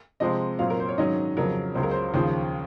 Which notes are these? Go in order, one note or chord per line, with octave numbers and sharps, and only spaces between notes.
C3 F3 G#3 C4 D#5
A#2 F#3 C4 F5
A#4
C5
C#5
G#2 D#3 F#3 C#4 D#5
F2 C#3 F#3 A#4
C#2 C#3 F#3 C5
A#4
C5
D#2 C#3 F3 C5